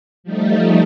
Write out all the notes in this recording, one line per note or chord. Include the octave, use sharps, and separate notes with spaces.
F3 G3 A3 D#4